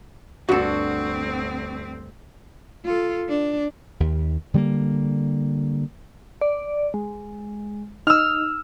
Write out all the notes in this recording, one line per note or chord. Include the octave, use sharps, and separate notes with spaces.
D2 G2 C4 F#4 A4
F4 A4
D4
D#2
D3 G3 A3 A#3
D5
G#3
D#4 E6 F6